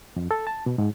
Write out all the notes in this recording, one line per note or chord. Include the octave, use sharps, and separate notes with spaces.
F2
A4
A5
B2
G#2